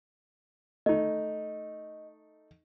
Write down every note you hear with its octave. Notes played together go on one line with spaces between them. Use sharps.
A3 D#4 D#5